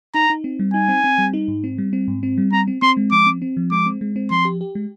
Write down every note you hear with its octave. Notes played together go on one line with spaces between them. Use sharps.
D#4 A#5
D#4
C4
G3
D#4 G#5
C4
C4
G3
D#4
G#2
C4
G3
C4
G#2
C4
G3
C4 A#5
C4
C4 C6
G#3
F3 D6
C4
C4
F3
G#3 D6
C4
G#3
C4
F3 C6
G4
G4
G#3